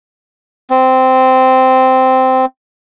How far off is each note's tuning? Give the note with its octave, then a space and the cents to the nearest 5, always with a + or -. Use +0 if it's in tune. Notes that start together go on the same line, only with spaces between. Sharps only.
C4 -10